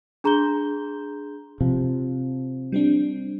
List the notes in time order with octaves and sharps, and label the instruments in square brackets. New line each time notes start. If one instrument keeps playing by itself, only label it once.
[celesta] D4 G#4 A#5 C6 G6 G7
[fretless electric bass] C3 F3
[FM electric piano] G3 C4 D4